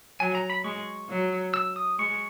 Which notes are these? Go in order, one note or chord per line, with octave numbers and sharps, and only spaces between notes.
F#3 G#5
A#5
B5
G#3 C#6
F#3
E6
D#6
G#3 C#6